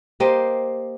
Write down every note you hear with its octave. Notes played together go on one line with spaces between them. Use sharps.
A#3 G4 C5 D#5